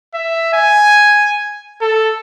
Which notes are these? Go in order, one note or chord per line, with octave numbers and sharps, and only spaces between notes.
E5
G#5
A4